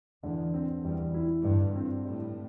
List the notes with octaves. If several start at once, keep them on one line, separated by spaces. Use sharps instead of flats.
E2 D3
C4
E2 G3
E4
G2 D3
C4
A2 G3